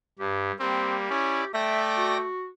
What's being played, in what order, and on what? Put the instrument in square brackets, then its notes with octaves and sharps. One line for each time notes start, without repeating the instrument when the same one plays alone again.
[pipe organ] G2 [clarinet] G4
[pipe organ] G3 A#3 [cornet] C4 [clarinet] G4
[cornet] C#4 [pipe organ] E4 D5
[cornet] A3 [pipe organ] D5 G5 A#6 [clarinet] E5
[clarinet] F#4